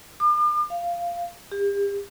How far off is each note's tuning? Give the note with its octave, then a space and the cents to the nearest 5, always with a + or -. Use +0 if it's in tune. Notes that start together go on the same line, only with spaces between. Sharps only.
D6 +45
F5 -10
G4 +40